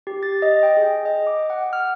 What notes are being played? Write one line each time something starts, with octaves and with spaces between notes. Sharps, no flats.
G4
A6
D#5
G5
G#4
D#5
D6
F#5
F6